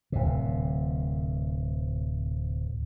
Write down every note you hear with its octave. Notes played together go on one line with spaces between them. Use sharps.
D1 C3